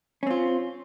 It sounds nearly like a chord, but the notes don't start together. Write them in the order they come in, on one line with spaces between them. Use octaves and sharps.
C#4 C4 F4